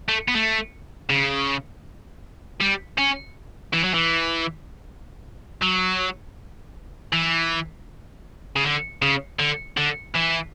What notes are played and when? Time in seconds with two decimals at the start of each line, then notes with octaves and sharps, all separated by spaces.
0.08 A3
0.28 B3
0.34 A3
1.10 C#3
2.61 G3
2.98 C#4
3.73 E3
3.84 F#3
3.94 E3
5.63 F#3
7.13 E3
8.56 C#3
8.64 D3
9.02 C#3
9.39 D3
9.77 D3
10.15 E3